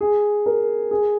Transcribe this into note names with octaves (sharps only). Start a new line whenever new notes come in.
G#4
A#4
G#4